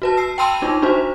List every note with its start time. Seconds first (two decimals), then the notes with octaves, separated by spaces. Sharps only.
0.02 F#4 B4 A5
0.17 E6 C7
0.38 G5 A5 B5 C6 E6 D#7
0.62 D4 D#4 F4
0.82 D4 F#4 C5